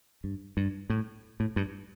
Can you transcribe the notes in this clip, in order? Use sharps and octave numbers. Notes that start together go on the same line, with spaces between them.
G2
G2
A2
A2
G2